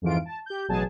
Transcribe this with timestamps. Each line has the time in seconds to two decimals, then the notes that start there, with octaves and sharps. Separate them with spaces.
0.02 F2 G#2 E3 F4 D7
0.25 A5
0.46 G4 G6
0.68 A1 B2 F#3 G#4 G#5 A5